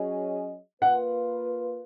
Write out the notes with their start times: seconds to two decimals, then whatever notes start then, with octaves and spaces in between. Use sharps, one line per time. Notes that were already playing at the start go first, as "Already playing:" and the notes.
Already playing: F#3 C#4 G#4 D#5
0.82 A#3 F4 B4 F#5